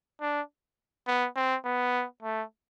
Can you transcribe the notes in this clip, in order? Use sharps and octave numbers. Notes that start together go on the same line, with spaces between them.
D4
B3
C4
B3
A3